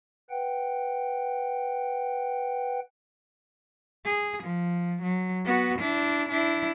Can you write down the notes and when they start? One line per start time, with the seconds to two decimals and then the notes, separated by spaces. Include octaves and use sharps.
0.30 B4 F#5 G5
4.05 G#4
4.43 F3
5.02 F#3
5.45 B3 F#4
5.79 D4 E4
6.29 D4 E4